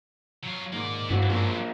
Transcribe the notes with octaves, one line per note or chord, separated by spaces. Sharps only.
F#3 F4
G#2 D#3 A#3 D5
G2 E3 C#4 F#4
F3 F#3 A#3 C4